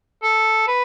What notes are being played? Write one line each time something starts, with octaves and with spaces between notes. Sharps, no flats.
A4
B4